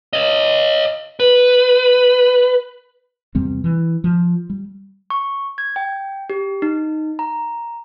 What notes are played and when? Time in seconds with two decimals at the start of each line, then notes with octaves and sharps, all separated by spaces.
0.13 C#5 D#5
1.20 B4
3.35 E2 C3 G3 C4
3.64 E3
4.04 F3
4.50 G3
5.10 C#6
5.58 G#6
5.76 G5
6.30 G4
6.62 D#4
7.19 A#5